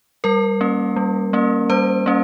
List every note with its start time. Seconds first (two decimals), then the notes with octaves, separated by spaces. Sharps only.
0.24 G3 A#4
0.61 A#3 C#4
0.96 G3
1.33 A#3 C#4
1.70 G3 C5
2.06 A#3 C#4